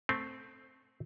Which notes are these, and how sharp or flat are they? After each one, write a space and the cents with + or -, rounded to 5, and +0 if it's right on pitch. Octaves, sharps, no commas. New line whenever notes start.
A3 +0 C4 +0